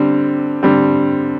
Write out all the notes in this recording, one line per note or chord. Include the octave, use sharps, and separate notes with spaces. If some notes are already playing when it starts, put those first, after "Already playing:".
Already playing: D3 G3 C4
D3 G3 C4